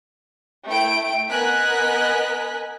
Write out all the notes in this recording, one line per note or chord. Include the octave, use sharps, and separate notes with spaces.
A3 E4 G5 D7
B3 A#4 D#5 G#5 F#6 B6